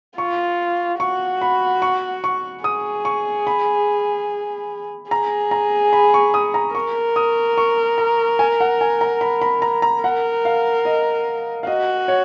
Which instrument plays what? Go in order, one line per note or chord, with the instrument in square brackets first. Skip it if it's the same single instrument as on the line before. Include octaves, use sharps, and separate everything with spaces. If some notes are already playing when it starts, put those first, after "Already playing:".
[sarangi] F4 [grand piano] C#6
[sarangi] F#4 [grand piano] C#6
[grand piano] B5
C#6
C#6
[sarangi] G#4 [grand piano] D#6
[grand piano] C#6
B5
[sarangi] G#4 [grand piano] A#5
[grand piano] A#5
B5
C#6
D#6
A#5
[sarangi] A#4 [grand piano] C#6
[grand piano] D#6
C#6
A#5
G#5
F#5
G#5
A#5
B5
B5
A#5
A#5
[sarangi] A#4 [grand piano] F#5
[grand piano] F5
D#5
F5
[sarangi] F#4 [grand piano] D#5
[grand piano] C#5